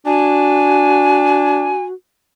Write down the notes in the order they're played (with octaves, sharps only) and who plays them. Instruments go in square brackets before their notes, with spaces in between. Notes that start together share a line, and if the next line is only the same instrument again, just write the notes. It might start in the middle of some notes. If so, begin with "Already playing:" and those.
[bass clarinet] D4 [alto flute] F#4 [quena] G#5